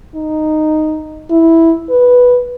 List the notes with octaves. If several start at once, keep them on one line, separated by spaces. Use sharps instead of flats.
D#4
E4
B4